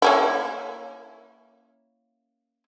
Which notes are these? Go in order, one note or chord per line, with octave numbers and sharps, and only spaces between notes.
A#3 C#4 E4